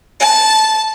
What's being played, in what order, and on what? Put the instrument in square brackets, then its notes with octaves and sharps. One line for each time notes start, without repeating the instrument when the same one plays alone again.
[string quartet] A5